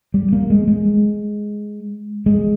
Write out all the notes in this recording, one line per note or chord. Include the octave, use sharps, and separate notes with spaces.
G3
A#3
G#3
G#3
G#3